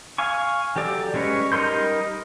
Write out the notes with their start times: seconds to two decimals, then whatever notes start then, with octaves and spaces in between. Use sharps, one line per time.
0.18 F5 G#5 C#6
0.76 F#3 G4 A4 D5
1.14 G3 G#3 C#4 B4 C#5
1.52 G3 D#4 A#4 C6 G6